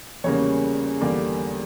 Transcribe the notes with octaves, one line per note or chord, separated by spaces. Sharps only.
E2 C#3 G3 A#3 C#5
E2 D3 G3 A#3 D5